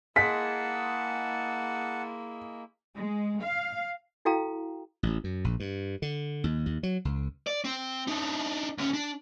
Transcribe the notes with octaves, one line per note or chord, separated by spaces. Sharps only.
G#3 A#3 E4 F#5 A5 B6
G#3
F5
E4 F#4 A4 F5 G5 A#5
A1
F#2
A#1
G2
D3
D#2
D#2
F#3
C#2
D5
C4
D4 D#4
D2 C#4
D4